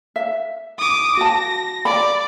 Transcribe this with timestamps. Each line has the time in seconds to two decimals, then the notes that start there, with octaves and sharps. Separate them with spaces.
0.16 E5
0.78 D6 D#6
1.17 F#4 A5 A#6
1.85 D5 B5